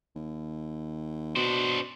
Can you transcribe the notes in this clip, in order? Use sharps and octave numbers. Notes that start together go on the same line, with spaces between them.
D#2
B2 D4 C5